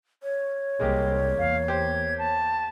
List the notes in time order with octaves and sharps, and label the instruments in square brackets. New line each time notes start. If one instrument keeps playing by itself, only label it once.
[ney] C#5
[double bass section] C2 C4 [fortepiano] G#3 A#3 G4
[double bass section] E2 A#3 [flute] F5
[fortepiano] G4 C5 [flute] G#6
[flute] A5